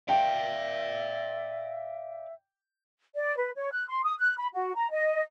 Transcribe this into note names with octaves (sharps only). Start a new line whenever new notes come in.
D5 E5 F5 G5
D5
B4
C#5
F#6
C6
D#6
F#6
B5
F#4
A#5
D#5